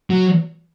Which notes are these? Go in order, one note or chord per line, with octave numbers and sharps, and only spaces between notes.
F#3